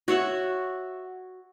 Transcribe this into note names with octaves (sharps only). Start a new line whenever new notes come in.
F#4 C#5 E5 F#5